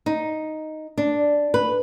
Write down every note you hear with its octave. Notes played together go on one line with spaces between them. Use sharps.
D#4
D4
B4